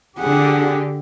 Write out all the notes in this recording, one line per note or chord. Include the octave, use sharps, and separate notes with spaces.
D3 G4 G#4 F#5